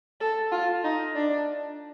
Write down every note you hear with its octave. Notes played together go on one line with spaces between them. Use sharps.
A4
F4
D#4
D4